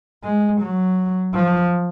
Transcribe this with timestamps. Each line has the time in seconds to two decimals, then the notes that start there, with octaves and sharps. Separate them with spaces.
0.24 G#3
0.61 F#3
1.34 F3